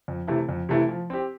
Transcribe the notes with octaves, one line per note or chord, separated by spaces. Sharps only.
F2
C3 E3 A3 E4
F2
C3 E3 A3 E4
F3
C4 G4